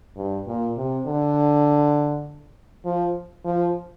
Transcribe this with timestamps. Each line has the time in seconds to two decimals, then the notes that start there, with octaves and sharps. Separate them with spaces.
0.17 G2
0.47 A#2
0.77 C3
1.06 D3
2.85 F3
3.45 F3